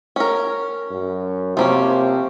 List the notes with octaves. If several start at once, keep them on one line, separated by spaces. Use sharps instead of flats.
C#4 A#4
F#2
C3 F3 A#3 C#4